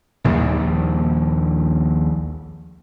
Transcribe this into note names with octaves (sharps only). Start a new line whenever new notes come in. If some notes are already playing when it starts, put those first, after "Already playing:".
A#1 D#2 A#2 G3